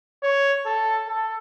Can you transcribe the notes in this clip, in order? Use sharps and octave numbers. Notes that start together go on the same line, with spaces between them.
C#5
A4
A4